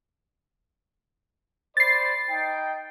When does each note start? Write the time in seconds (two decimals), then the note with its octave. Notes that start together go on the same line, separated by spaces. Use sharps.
1.77 C5 D5 B5 A6 C7
2.29 D#4 G5